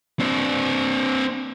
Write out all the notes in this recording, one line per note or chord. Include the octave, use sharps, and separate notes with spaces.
C4 D4